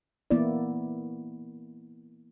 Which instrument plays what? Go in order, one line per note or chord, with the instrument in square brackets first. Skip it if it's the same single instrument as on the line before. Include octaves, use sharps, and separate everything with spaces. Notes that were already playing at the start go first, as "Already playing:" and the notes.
[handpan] E3 A#3 B3 E4 D5